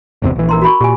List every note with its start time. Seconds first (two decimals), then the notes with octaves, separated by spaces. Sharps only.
0.22 G1 E2 C3
0.36 A#1 E3
0.49 A#4 A#5 C6
0.62 F#4 B5 C#6
0.81 A#2 G4 G#5